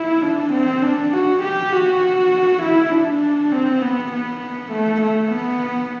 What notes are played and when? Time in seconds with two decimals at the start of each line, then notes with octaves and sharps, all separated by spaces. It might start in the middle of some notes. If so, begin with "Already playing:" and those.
Already playing: E4
0.22 D4
0.53 C4
0.82 D4
1.13 F#4
1.42 G4
1.72 F#4
2.62 E4
2.91 D4
3.52 C4
3.81 B3
4.12 B3
4.72 A3
5.01 A3
5.31 B3